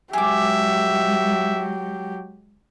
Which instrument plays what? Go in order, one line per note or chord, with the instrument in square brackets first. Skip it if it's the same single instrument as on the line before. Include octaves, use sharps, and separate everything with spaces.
[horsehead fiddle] F#3 G4 [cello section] G#3 [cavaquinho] G#4 D6 [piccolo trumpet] E5